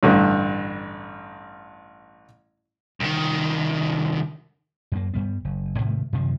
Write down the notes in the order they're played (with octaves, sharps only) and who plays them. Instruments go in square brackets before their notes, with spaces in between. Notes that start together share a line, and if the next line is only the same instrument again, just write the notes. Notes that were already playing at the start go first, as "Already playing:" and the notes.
[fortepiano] A1 G2 D3
[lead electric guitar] C2 D#3
[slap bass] F#2 A#3
G2 G3 B3
F#1
G#2 C3 D#3 A3
F#2 C3 D#3 F3